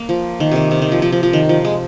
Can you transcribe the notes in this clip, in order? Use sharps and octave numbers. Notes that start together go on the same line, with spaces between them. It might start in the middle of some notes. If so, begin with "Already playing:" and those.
Already playing: A#3
F3
D#3
C3 D#3
C3
D#3
F3
F3
F3
F3
D#3
F3
G#3